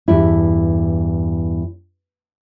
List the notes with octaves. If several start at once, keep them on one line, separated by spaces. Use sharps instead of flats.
E2 G2 E4